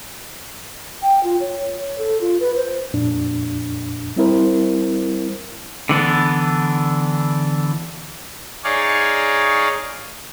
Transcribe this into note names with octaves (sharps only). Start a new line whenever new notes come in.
G5
F4
C#5
C#5
A4
F4
B4
C5
F2 A#2 D4
G3 C4 E4 A#4 C5
D3 E3 B3 D4
D#4 G#4 C#5 D5 F5